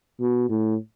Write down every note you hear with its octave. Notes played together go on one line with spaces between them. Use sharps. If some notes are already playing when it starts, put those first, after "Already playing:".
B2
A2